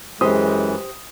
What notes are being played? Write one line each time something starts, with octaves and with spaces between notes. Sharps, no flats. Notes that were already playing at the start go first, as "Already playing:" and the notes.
F#2 E3 G#3 G4 C5 D#6